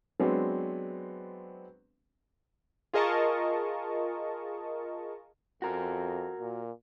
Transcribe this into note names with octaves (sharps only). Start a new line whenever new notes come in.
F#3 G#3 B3 C4 D4
F4 G#4 A#4 D#5 A5 C#6
F2 F#4 A#4
A#2